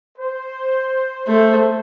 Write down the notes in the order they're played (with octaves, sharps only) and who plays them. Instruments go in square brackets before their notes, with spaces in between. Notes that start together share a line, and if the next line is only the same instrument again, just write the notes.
[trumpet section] C5
[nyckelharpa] A3 [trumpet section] C5